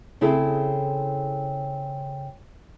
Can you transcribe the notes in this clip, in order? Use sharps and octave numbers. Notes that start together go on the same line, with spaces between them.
C#3 C4 E4 G#4 A4